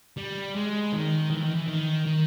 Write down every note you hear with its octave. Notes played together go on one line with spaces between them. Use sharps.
G3
G#3
D#3
E3
D#3
E3
D#3
D#3